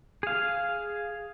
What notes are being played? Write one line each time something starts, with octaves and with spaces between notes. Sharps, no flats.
G#4 F5